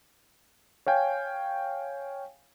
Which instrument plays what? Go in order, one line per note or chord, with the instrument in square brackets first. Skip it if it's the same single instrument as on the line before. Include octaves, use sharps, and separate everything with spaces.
[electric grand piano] C#5 F5 G5 G#5